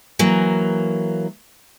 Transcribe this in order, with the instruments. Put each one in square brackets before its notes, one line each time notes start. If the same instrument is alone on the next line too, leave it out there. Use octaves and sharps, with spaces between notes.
[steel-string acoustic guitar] E3 F#3 A#3